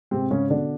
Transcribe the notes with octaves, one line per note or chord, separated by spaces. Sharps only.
G#2 C3 C4
G#2 C#3 C#4
B2 D3 D4